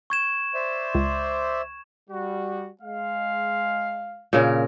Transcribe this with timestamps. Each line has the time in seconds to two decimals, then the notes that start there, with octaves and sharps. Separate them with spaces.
0.10 C#6 G#6 E7
0.54 C5 D5 E5
0.95 C#2
2.10 G3 F#4
2.82 G#3 F5
4.33 A#2 C#3 A#4